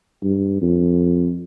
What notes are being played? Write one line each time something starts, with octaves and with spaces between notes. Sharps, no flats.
G2
F2